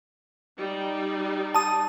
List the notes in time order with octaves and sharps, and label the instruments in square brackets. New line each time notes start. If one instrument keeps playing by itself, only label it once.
[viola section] G3 D#4
[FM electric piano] A5 D#6